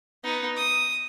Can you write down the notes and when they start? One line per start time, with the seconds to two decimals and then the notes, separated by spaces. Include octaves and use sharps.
0.24 B3 D#4
0.57 D#6